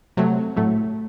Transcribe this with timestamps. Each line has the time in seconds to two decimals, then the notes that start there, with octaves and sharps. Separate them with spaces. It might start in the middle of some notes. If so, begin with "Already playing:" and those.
0.17 C3 F#3 A3
0.56 A2 F#3 A3